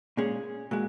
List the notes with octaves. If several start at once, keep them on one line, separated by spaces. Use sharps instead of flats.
A#2 G#3 C#4 G#4
A#2 G#3 F#4